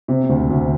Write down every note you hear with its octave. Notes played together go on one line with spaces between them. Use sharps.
C3
D2
D2